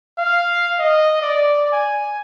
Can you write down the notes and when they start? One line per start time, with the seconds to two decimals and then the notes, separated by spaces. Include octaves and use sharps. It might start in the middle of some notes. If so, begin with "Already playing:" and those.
0.18 F5
0.79 D#5
1.21 D5
1.72 G#5